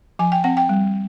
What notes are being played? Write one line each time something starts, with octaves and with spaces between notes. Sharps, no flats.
F3 G#5
G5
C4 F#5
G5
G3